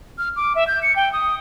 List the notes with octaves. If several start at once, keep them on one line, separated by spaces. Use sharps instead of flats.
F6
D6
E5
G6
C#7
G5
D#6